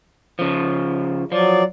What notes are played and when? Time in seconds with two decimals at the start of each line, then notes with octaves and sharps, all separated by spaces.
0.39 C#3 F3
1.32 F3 F#3 D5